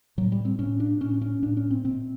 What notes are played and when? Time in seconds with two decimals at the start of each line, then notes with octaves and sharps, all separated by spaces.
0.17 A2 F#3
0.32 G3
0.45 C4
0.59 A2 C#4
0.80 D4
1.00 A2 C#4
1.14 D4
1.21 C#4
1.42 A2 D4
1.57 C#4
1.71 C4
1.84 A#2 C4